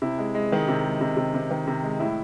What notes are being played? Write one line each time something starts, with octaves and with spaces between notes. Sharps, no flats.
C3 E4
G#3
G#3
D#3
C3
G#3
C3
C3
C3
D#3
C3
G#3
A2 E4